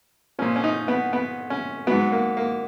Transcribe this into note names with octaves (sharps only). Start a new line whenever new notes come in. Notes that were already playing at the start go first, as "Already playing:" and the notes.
A#2 F3 C#4
C#4
D#4
B3
B3
C#4
G#2 F#3 B3
A#3
A#3